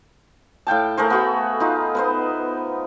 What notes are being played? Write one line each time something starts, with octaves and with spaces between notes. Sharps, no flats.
A2 F5 G5 A5
A3 G#4 A#4 C5
B3 F#4 B5
D#4 F4
B3 B4 C5